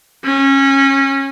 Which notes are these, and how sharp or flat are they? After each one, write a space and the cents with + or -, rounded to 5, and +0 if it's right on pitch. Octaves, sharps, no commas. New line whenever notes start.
C#4 -20